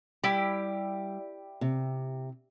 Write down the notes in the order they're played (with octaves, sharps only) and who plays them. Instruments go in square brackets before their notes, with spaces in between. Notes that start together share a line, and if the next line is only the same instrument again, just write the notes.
[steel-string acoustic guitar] G3 [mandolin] E4 G4
[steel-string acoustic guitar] C3